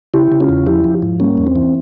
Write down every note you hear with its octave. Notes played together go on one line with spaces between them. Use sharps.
C#3 E4 G4
C#3
C#4 F4
E2
F3 E4 G4
F3
G#2
G3 A#3 C#4
E2
C4
E3